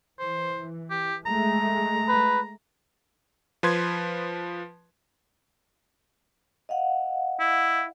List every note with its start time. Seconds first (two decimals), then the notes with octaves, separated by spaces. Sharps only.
0.19 E3 C5
0.90 G4
1.26 G#3 A3 A#5
2.08 B4
3.63 F3 B4 C6 G#6
6.69 D#5 F5 F#5
7.40 E4